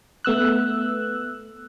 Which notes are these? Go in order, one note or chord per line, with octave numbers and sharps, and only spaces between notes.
A3 B3 E6 F#6